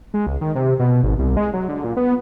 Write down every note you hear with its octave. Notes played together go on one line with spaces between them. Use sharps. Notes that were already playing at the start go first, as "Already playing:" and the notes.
G#3
C#2
D#3
C3
B2
G#1
C2
G#3
F#3
D3
A#2
B3